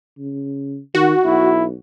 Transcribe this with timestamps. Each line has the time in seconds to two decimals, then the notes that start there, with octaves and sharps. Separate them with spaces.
0.18 C#3
0.95 D#3 F#4
1.25 B1 E4